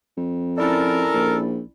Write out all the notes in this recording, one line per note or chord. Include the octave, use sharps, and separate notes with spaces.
F2
C#4 E4 A4 A#4 D5
A#1